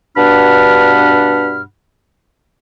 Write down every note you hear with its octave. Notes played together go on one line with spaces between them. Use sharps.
G2 B2 D4 F#5 B5 F6